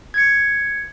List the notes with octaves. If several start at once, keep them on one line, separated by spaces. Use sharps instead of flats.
G#6 C#7